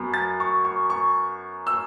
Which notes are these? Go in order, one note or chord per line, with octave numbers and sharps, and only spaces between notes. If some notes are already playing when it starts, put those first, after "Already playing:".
Already playing: F#2 F#3 B3
A6
C#6
C#6
C#6
E6